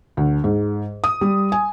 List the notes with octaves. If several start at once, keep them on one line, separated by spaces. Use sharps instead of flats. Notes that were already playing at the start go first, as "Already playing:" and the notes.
D2
G#2
D#6
G3
G#5